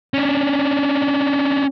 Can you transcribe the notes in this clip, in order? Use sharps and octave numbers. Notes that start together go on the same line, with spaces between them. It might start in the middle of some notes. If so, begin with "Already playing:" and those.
C#4 D4